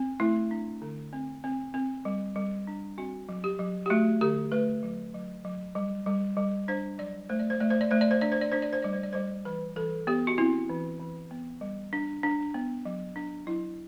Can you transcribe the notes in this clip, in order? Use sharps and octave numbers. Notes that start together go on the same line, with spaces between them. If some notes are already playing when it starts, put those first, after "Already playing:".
Already playing: C4
A3 E4
D4
D3
C4
C4
C4
G3
G3
D4
C4 F#4
F#3
G4
F#3
G4
A3 F#4
D3 G4
A3 B4
F#3
F#3
F#3
G3
G3
G3
D4 C5
F#3 D5
A3 C5
D5
C5
A3 D5
C5
D5
A3 C5
D5
C5
D4 D5
C5
D5
D4 C5
D5
C5
G3 D5
C5
D5
G3 C5
E3 B4
E3 A4
B3 G4
F#4
C4 E4
E3
E3
B3
G3
D4
D4
B3
F#3
D4
F#3 E4